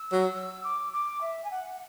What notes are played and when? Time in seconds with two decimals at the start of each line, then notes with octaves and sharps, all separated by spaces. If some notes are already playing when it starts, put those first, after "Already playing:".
Already playing: E6
0.12 F#3
0.34 E6
0.64 D6
0.92 D6
1.20 E5
1.44 G#5
1.50 F#5